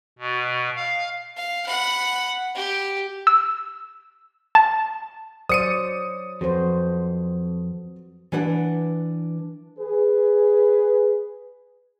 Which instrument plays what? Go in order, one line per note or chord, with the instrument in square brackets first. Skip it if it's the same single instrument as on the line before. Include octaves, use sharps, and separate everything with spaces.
[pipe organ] B2
F5
[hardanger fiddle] F5
F#5 B5
G4
[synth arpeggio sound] E6
A5
[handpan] F#3 C5 D5 [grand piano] D#6 C#7 D#7
[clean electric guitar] F2 [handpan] F#4 B4 C5
[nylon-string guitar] E3 D4 B4 F#5
[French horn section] G#4 B4